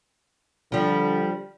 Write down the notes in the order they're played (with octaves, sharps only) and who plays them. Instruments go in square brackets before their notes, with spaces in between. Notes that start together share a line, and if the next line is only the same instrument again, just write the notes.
[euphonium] D3 [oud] F3 G3